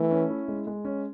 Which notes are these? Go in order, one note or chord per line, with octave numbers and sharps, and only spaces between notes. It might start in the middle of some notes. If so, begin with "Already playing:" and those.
Already playing: E3 A3
C#4
E4
G#3
G#3
C#4